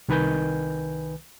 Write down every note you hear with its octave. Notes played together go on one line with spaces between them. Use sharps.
C2 D#3 B4 G#5 G6